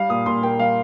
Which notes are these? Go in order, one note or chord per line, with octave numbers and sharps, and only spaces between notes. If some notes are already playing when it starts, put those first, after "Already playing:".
Already playing: G3 F5
A#2 D#6
A#2 C6
A#3 G5
G3 F5